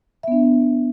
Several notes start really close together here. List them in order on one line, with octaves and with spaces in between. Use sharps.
E5 B3 D4